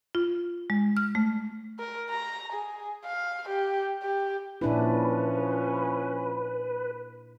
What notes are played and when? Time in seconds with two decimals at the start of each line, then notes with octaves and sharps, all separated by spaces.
0.15 F4
0.70 G#3
0.97 F6
1.15 A3
1.79 A#4
2.10 A#5
2.52 G#4
3.05 F5
3.49 G4
4.02 G4
4.61 A#2 F3 C#4 D4 E4 B4